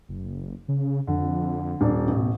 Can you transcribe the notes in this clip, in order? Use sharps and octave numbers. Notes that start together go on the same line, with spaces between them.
F#1
C#3
F2 D3
D#1 D4
A1 B2